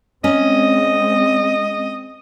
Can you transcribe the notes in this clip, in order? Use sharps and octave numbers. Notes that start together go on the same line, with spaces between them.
G#3 C4 C#4 D#5